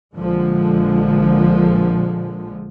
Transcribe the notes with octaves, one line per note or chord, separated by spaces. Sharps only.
A#1 D3 F3 G#3